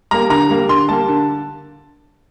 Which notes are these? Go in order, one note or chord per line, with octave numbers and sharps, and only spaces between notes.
G3 A#3 A#5
D3 A#5
G3 A#3
D3 C6
G3 A#3 A5
D3